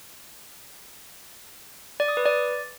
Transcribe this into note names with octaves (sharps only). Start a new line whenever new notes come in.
D5
D#6
B4
D5